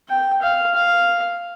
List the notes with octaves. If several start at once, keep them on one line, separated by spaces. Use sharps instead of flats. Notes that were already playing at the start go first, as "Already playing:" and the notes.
G5
F5
F5